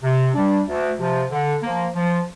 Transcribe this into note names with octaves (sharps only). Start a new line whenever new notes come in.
C3
G3 D4
D2
C3 F3
D3
F3 A#3
F3